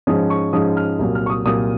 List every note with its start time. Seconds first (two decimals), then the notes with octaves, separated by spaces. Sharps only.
0.07 G#2 F3 G#3 C#4 D#6
0.30 C#6
0.53 G#2 F3 G#3 C#4 D#6
0.77 F6
0.99 C2 A#2 F#3
1.15 F6
1.26 C#6
1.30 D#6
1.45 C2 A#2 F#3 D#6